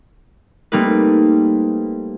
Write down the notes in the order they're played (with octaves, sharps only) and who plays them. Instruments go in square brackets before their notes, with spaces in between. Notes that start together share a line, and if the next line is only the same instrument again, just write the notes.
[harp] G3 A3 A#3 C4 D#4 B4